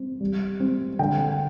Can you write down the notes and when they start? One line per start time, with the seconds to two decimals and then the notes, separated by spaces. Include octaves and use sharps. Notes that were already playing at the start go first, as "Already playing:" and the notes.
Already playing: C4
0.20 G3
0.60 C4
0.99 D3 G5